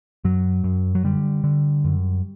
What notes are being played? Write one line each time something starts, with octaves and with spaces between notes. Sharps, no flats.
F#2 F#3
F#2
F#3
D3 G3
D3
F#2